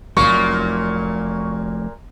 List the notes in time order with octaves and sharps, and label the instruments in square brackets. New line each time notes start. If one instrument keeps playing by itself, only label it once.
[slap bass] F1 C2 F#3 [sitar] A#2 A#3 [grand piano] C#6